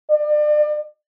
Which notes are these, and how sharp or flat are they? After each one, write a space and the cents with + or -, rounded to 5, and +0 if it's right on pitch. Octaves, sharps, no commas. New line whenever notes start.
D5 +35